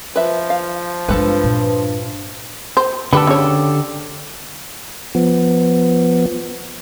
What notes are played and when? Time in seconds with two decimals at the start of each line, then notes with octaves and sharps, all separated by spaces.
0.16 F3 B4 E5
0.50 F5
1.09 G2 G#3 C4 A4 B4
1.44 A#2
2.77 C5
3.13 D3 G4 A4 B4
3.27 C#3 C#5
5.15 F3 B3